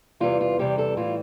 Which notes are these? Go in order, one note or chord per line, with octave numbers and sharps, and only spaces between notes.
E2 C3 E3 G3 F4
F4
E2 C3 E3 G3 G4
A4
A2 E3 G3 F4